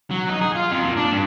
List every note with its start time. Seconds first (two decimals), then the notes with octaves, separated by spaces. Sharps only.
0.11 F#3
0.29 D#4
0.41 G#4
0.55 F4
0.72 F2
0.83 A#2
0.97 D4
1.11 G2